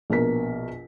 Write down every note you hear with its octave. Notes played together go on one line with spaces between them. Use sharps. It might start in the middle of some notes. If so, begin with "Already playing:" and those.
A#1 B2 A#4 B6